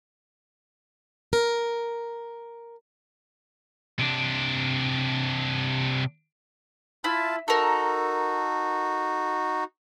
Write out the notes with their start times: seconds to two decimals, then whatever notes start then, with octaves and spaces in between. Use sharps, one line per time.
1.33 A#4
3.99 C3 D4
7.04 E4 F4 A5
7.48 D#4 F#4 A4 A#4